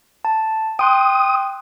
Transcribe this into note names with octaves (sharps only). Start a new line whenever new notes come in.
A5
G5 C6 D#6 F#6